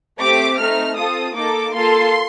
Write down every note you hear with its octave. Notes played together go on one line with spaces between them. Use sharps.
A3 C4 G4 D6
A3 C4 D#4 F6
C4 F4 A4 D#6
A#3 D#4 A4 D6
A#3 F4 A4 C6